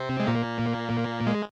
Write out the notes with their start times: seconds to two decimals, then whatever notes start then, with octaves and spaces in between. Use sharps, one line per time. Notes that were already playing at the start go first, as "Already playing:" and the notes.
Already playing: C3 C4
0.20 G#3
0.27 A#2 A#3
1.27 G#3